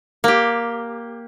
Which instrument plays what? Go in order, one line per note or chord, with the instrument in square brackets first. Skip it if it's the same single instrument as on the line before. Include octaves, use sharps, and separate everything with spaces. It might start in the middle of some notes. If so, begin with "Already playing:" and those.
[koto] A#3 G4